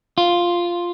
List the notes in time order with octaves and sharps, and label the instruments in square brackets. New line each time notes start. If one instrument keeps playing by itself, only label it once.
[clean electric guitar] F4